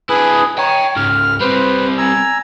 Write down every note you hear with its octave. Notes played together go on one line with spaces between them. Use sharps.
D4 E4 G#4 B4 D#6
C#5 G5 A#5
C#2 G#2 F6
G3 C4 B4 C5
G#5 A#5 E6